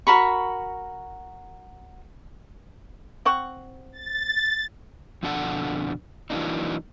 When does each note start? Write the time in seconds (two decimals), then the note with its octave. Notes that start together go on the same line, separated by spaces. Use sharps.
0.07 F#4 A#4 B5 C#6
3.25 C4 F#5 C#6
3.92 A6
5.23 F2 B2 D3 D4 A4 F#5
6.30 E3 F#3 G#3 A#3 D4 D#4